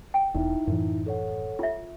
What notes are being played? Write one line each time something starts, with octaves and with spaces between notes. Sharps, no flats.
G5
E1 E2 D#4 E4 E5
F#2 A2 E3
A4 C#5 F#5
F4 E5